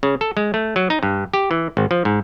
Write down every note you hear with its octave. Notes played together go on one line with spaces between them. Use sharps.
C#3
A4
G#3
A3
F#3
D#4
G2
G4
E3
G#1
F3
G#2